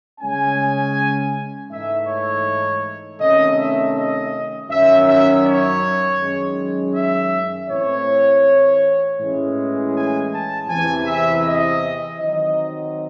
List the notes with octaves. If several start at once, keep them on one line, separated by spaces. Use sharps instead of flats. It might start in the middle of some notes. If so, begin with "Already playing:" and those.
C#3 G#3 C#4 G#5
G#2 E3 A3 D#4 E5
C#5
C3 D#3 A3 C#4 D#5
E5
D#5
F#2 D#3 F#3 C#4 E5
E5
C#5
F#2 D#3 G#3 C#4
E5
A2 E3 A3 C4 C#5
A2 E3 G#3 C#4
G#5
A5
E2 C3 E3 G#5
E5
D#5
D#3 F#3 C4 D#4 D#5